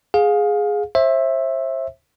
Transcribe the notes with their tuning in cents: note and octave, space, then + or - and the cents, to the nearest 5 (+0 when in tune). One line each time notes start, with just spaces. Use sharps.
G#4 +0 F5 +25
C5 +35 E5 +0